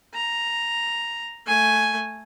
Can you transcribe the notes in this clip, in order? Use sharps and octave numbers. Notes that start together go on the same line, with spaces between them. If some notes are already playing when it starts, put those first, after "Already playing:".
A#5
A3 G#5